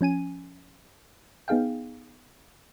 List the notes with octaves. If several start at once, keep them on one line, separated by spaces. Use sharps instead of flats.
F3 C#4 G#5 D#7
B3 D#4 G#4 F5 G5